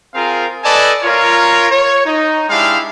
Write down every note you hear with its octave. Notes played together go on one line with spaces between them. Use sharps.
C4 F4 G#4 A#4 F5
A4 B4 D5 D#5 G#5 A5
F4 A#4 C#5
C#5
D#4
G#3 D4 E4 G4 F5